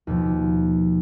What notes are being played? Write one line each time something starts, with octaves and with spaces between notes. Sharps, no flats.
D#2 B2 F3